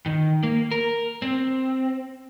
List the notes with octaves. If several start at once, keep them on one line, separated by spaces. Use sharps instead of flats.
D#3
A#3
A#4
C4